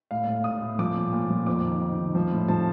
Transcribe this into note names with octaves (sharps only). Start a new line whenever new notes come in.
A2 F5
A2
A2 D#6
A2
F3 D6
A#2
A#2
F3
F2 D6
D#3
D#3
D#3
F3
A2
F3 A5